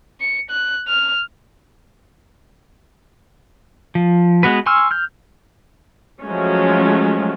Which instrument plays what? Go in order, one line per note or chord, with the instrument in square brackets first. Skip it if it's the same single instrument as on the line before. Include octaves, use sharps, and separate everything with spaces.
[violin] C#7
F#6
F6
[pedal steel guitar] F3
G#3 B3 F#4 B4
G#5 C6 C#6 E6 F6
F6 G6
[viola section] F3 F#3 G#3 A3 C#4